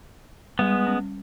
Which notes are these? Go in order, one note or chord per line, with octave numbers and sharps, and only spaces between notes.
G3 G#3 B3
C#4